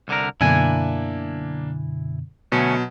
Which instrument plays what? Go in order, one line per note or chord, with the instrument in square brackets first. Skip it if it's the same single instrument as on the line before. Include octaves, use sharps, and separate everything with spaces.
[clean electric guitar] C2 D3 A#4
[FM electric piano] F#2 B2 D3 [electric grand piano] A#3 D4 [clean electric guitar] E4 G#5
[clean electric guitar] D2 A3 C#4 [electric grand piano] B2 F#3